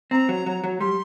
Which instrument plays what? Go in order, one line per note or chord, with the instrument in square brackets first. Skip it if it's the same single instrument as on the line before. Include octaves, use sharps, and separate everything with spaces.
[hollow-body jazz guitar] C4 [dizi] A#5
[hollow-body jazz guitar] F#3
F#3
F#3
[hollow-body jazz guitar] G3 [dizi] C6